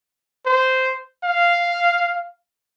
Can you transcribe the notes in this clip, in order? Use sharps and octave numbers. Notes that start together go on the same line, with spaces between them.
C5
F5